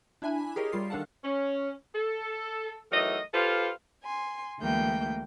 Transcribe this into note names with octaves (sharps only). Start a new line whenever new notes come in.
D4 E4 E5 G#5 B5
G4 G#4 A#4 C#5 D#5
G3 F4 C7
D#3 D4 A4 F5 F#5 A5
C#4
A4
E3 F#3 A3 D#4 A#4 D#5
F4 G4 A4 B4 C5 F5
G#5 C6
D2 E3 G#3 A#3 G5 G6